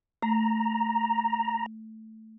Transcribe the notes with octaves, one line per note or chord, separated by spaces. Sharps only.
A3 A#5